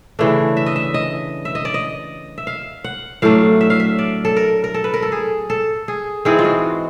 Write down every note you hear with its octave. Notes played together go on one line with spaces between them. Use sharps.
C#3 E3 A3 D4
E5
D#5
E5
D#5
E5
D#5
D5
D#5
E5
F5
F#5
A2 F#3 A3 D4 F5
E5
F5
E5
D5
A4
A#4
A#4
A4
B4
A#4
A4
G#4
A4
G#4
G#2 E3 G#3 C4 G#4
F4
F#4